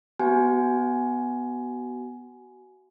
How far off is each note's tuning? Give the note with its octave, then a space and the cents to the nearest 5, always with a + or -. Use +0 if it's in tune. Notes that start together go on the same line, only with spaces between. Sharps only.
B3 +0 F#4 +25 G#5 +15